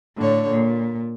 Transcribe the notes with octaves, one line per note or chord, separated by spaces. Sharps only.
A2 D3 C#5
A#2